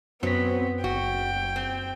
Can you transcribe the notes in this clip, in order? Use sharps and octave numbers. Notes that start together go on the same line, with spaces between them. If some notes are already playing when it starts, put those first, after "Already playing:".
F#2 F#3 B3 C4 B6
F#1 F#4 G5
C4